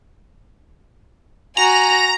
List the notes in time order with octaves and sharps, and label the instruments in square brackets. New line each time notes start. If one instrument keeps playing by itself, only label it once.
[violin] F#4 G#5 [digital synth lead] A#5